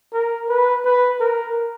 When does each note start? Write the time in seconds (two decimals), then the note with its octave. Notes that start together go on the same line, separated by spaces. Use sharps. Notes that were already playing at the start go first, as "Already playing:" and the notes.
0.13 A#4
0.49 B4
0.85 B4
1.20 A#4